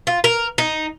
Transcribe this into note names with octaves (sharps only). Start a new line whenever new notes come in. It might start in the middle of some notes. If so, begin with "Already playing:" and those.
F4
A#4
D#4